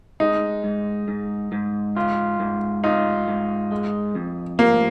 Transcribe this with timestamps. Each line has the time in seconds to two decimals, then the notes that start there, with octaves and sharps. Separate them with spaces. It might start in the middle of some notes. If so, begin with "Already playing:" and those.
0.20 G#3 D#4
0.64 G#2
1.08 G#2
1.52 G#2
1.97 F4
2.40 G#2
2.84 D#4 F4
3.28 G#2
3.72 G#3
4.15 F2
4.59 F3 A#3